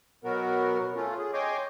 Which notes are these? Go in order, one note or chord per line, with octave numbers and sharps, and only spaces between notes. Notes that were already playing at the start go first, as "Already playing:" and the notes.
B2 F#3 B3 F#4 A#4
A3 C#4 F4
G#4
C#5 D#5 G5 G#5 C6 D6